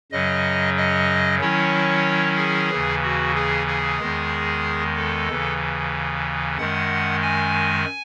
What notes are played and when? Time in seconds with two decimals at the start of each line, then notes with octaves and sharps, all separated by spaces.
0.12 F#2 C#3 F#3 D#5
0.77 D#5
1.40 D#3 F#3 C#4 E4 C#5
2.37 G#4
2.70 D#2 C#3 E3
3.03 F#4
3.35 G#4
3.67 G#4
3.99 E2 D#3 G#3
4.96 A4
5.28 D#2 C#3 E3
6.58 F#2 D#3 G#3 F#5
7.22 G#5